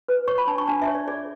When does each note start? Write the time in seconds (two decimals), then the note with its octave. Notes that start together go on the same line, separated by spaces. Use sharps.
0.08 B4
0.28 C#5 C#6
0.38 B5
0.47 D4 A5
0.58 C#6
0.67 D4 A5
0.82 E5
0.87 C#5
0.95 D5
1.08 G#4 D5